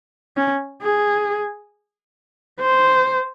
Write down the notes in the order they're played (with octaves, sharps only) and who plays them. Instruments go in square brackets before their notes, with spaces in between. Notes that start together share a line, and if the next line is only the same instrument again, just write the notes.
[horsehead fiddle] C#4
G#4
C5